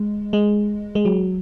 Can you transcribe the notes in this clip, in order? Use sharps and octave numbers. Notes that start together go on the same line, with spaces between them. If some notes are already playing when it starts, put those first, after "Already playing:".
Already playing: G#3
G#3
G#3
F#3